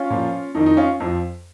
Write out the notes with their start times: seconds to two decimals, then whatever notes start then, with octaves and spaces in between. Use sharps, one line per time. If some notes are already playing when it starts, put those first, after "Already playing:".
Already playing: C#4 F4
0.10 A#2 F3
0.55 F2 D#3 D#4
0.66 D#4
0.77 C#4 F4
1.00 F2 F3